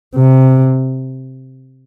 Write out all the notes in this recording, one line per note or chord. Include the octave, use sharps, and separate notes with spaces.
C3